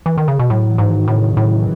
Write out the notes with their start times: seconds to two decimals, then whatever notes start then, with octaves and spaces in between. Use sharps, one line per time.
0.06 E3
0.18 D#3
0.28 C#3
0.39 B2
0.50 A2 F#3
0.70 E3
0.78 G#2
0.89 D#3
1.08 A2 C#3
1.22 C#3
1.37 A2 D#3
1.51 E3